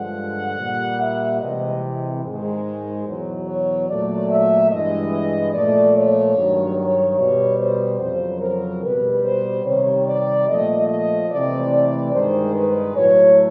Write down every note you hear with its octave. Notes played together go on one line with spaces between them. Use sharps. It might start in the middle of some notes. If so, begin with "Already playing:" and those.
Already playing: G2 D3 F3 G#3 F#5
A#2 G3
E5
C3 E3 G#3 D#5
G#2 D#3 G#3 C5
E2 B2 F#3
C#5
A#2 F#3 A3 D5
E5
G2 E3 G#3 D#5
A#2 F3 A3 D5
C#5
G2 D#3 F#3
C#5
B2 G3
C5
F2 C#3 F#3 C5
A#4
B2 G3 B4
C5
C3 D#3 G3 C#5
D5
A#2 F3 A3 D#5
D#5
C3 E3 A3 D5
D5
G2 D#3 G#3 C5
B4
A2 F#3 A3 C#5